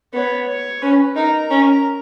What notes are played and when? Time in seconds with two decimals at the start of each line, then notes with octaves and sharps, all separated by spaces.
0.14 B3 C#5
0.48 C#5
0.82 C#4 B4
1.16 D#4 A#4
1.50 C#4